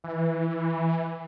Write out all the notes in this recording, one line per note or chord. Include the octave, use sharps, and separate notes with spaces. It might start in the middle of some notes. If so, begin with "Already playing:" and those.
E3